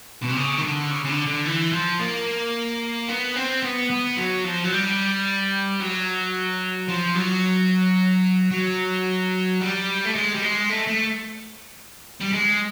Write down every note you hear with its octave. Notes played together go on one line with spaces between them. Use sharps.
B2
C3
C#3
D#3
D3
C#3
C#3
D3
D3
E3
F3
A#3
B3
C4
B3
B3
F#3
F3
F#3
G3
F#3
F3
F#3
F#3
G3
A3
G#3
G3
G#3
A3
A3
G3
G#3